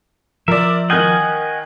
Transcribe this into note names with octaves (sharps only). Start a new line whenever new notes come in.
F3 A#4 D5 E5
D#3 D#5 F#5 G#5 F6 G6